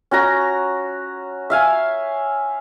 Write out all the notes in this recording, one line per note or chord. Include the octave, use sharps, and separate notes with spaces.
C#4 F#4 A#5
E5 F5 G#5